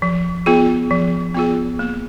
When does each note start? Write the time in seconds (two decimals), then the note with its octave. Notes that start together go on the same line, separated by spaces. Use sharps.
0.02 F3
0.46 B3 F4 G#4
0.91 F3
1.34 B3 F4 G#4
1.79 A#3